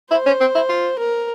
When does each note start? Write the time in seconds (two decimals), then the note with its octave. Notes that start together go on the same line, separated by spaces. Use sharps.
0.11 E4 C5
0.26 C#4
0.40 C4
0.55 E4
0.69 F4
0.99 A#4